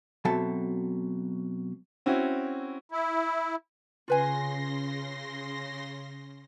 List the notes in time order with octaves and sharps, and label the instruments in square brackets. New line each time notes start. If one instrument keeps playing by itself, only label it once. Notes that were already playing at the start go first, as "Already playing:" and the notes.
[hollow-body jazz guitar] B2 F#3 C4 A4 E5 A5
[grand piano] C4 C#4 E4 F#4
[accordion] E4
[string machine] C#3 C6 A#6 [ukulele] F4 B4 G#5